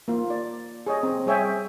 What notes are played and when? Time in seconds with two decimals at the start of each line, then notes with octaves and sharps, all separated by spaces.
0.08 A#3 F4
0.30 D5
0.87 G#4 C#5 D#5
1.03 C4
1.26 G3 G#4 C#5 E5 G5 G#5